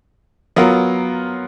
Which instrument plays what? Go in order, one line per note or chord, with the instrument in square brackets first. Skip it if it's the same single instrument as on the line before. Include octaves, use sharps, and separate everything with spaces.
[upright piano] F#3 B3 F4 A#4